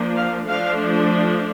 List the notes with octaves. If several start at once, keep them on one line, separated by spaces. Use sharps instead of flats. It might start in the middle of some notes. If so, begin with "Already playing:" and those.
Already playing: F3 A#3 D4
F5
F3 A3 D4 F5